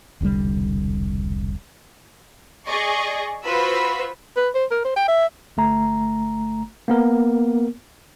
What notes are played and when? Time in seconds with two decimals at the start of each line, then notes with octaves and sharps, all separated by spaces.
0.21 E1 C2 D3 G3
2.66 G#4 D5 D#5 C#6
3.43 F4 F#4 B4 C5 B5 E6
4.37 B4
4.55 C5
4.71 A#4
4.85 C5
4.96 G5
5.08 E5
5.57 G1 A3 A#5
6.88 A#3 B3 A#4